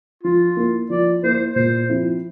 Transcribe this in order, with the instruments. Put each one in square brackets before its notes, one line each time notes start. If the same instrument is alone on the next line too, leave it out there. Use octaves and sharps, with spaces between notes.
[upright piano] F3 [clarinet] F4
[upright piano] A#3 E4
[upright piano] F3 [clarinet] D5
[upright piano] A#3 E4 [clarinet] C5
[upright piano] A#2 [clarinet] C5
[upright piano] F3 C4 E4